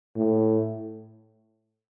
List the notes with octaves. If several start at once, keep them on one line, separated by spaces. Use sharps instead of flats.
A2